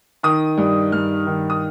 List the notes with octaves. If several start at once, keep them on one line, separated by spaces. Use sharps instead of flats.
D#3 D#6
G2
G2 F6
D#3
D#6